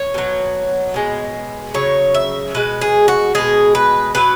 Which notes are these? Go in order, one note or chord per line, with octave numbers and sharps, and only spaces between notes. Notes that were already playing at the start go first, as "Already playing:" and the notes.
Already playing: C#5
B2 F#3
B2 G#3
C#3 F#3 C#5
E5
B2 G#3 B4
G#4
F#4
B2 G#3 G#4
B4
B2 F#3 B4